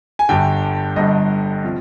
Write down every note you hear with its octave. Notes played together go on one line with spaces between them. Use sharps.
G#5
G1 G2 D3 G5
G1 G2 D3 D#5
C3 F3